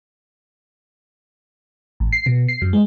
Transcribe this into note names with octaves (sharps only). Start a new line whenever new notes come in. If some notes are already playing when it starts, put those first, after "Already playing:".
A1
C7
B2
C7
F#2
G#3